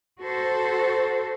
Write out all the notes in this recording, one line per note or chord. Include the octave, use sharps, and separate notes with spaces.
F#4 A4 C5